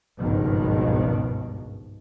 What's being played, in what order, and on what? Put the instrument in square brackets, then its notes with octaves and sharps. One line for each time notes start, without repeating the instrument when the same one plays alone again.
[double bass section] G#1 C#2 G2 B2 D#3 F3